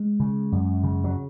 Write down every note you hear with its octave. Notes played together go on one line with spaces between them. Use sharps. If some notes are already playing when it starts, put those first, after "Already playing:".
Already playing: G#3
C#3
F#2
C#3
F#3